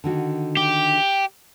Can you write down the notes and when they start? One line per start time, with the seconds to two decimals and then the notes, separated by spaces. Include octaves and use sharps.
0.04 D3 D#3 F#4
0.57 G4